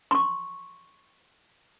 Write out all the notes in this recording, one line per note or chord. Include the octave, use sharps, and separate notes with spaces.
C6 C#6